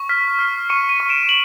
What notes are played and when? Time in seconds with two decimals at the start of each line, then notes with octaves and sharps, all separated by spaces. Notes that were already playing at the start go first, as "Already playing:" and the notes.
Already playing: C#6
0.09 F6 B6
0.39 F6 C7
0.69 C#6 C#7 D#7
0.89 C#7 D#7
1.00 C#6
1.09 D7 E7
1.29 F#7